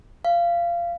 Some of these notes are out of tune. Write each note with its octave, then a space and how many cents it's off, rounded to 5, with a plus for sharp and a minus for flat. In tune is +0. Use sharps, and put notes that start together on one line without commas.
F5 -20